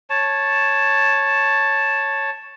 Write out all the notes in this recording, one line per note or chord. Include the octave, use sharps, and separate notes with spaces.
C#5 A5